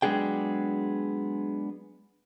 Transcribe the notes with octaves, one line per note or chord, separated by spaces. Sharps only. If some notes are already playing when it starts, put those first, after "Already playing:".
F#3 G#3 B3 D4 G#4 G5